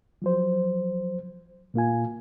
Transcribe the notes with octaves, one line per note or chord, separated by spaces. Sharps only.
F3 F#3 C5
A#2 A#3 F4 G#5